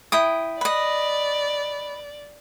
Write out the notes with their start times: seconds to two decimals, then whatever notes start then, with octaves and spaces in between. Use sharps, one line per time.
0.12 E4 G5 D#6
0.61 B4 D5 D#5